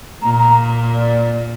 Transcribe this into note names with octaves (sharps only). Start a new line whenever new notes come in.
A#2 A#5
A#5
D5